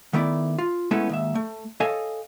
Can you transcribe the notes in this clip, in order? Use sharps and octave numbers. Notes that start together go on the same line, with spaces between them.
D#3 A3 B3 E4 D5
F4
G#3 A3 B3 C#4 E4 A4
D#2 G#2 E5
A3
A4 C#5 D#5 F5 G#5